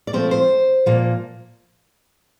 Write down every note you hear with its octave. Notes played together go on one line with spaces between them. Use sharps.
D5
A#2 F3 A3 C4 C5
C5
A#2 F3 A#3